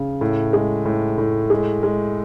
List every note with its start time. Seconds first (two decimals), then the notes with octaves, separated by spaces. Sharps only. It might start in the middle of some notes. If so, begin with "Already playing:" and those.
Already playing: C#3
0.21 A2
0.53 G#3
0.85 A2
1.18 A2
1.50 G#3
1.83 G#3